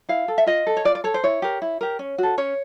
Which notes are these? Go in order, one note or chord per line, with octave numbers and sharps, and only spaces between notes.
E4 F5
A4
E5
F4 D#5
A4
C#5
F4 D5
D5
A4 C#5
C5
E4 C#5
G4 A#4
E4
G4 A#4
C#4
F#4 A4
C#4 C#5